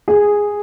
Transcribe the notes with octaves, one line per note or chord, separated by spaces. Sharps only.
G#4